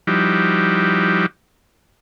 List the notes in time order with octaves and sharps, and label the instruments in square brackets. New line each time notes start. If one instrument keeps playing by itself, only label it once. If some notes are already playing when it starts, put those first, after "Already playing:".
[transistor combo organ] F3 G3 D#4 E4 F#4 G4